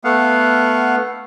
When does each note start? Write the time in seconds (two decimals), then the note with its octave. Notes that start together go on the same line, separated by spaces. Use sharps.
0.04 A3 B3 F5 F#5